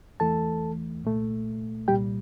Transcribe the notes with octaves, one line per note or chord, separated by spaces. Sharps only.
E2 E3 A3 A4 A5
C2 A#2 A3
C2 A#2 G3 G4 G5